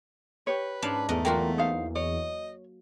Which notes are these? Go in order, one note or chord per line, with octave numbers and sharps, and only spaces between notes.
G4 B4 C#5
G#2 C#4 D4 F5
E2 A3 A#4 D#5 F#5
F#3 A#3 F4 F#4 A#4 G5
D#4 C5 F5
C#5 D#5